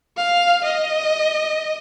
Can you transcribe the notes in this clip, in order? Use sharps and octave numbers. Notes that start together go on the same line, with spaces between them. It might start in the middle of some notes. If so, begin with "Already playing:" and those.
F5
D#5